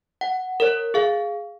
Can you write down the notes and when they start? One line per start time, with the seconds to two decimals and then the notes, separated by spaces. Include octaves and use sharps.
0.21 F#5
0.60 A#4 C#5
0.94 G#4 F5